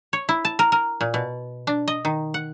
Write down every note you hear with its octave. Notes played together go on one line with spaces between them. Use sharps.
C#5
E4
A5
A#4
A#4
A#2
B2
D4
D#5
D#3
F#5